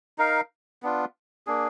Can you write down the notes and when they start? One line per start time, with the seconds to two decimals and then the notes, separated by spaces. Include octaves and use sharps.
0.18 D#4 A#4 F5
0.83 B3 D4 F4
1.47 A#3 D4 G#4